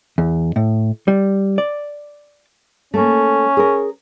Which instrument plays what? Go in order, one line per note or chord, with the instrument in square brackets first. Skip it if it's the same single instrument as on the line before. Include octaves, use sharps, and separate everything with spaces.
[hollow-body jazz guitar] E2
A2
G3
D5
[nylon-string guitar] A3 A#3 [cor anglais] C#4
[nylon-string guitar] G#4 A#4